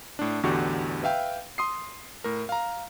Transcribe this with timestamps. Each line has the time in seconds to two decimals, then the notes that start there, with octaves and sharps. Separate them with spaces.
0.19 A2 D4
0.43 A1 E2 D3 F#4 G4 C#6
1.03 B4 E5 F5 G5
1.58 C6 D#6 C7
2.24 A2 A#4
2.49 F5 A#5